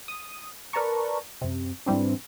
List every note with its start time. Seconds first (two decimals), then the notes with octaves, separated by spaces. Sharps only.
0.08 D#6
0.73 A#4 B4 D5 A5 A#5 C#6
1.41 F#2 C3
1.86 G#2 E3 G3 C4 D4